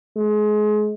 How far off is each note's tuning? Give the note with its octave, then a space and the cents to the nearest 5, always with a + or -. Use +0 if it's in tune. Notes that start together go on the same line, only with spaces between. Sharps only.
G#3 +30